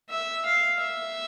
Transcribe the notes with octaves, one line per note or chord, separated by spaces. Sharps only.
E5
F5
E5